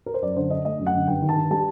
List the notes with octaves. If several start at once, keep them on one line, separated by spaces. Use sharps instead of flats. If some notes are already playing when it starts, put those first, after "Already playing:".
A#4
C5
F#2 D5
D3 C5
D4 D#5
A3 D#5
F#2
F#5
D3
G2 G5
D#3
A5
G2
G3 A5